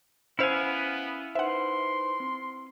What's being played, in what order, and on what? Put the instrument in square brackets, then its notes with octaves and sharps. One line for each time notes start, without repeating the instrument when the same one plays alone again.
[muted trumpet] B3 [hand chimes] C#4 [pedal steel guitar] E4 F5 G#5 [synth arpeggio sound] C5 E6 C#7
[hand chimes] D#4 B4 C5 [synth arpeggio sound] E5 F#5 [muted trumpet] C6
[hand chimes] C4